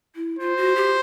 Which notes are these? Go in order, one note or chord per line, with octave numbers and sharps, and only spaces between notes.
E4
F4 C5
F#4
G4